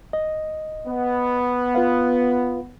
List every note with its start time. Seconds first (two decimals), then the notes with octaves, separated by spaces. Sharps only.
0.13 D#5
0.88 B3
1.75 F4 B4 F5